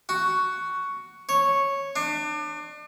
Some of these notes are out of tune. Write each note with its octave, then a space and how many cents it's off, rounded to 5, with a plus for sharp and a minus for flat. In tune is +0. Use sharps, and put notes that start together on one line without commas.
F#4 +5
C#5 -5
D4 +35